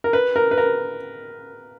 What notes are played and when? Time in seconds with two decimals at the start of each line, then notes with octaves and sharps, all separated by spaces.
0.04 A#4
0.13 B4
0.36 A#4
0.51 B4
0.58 A#4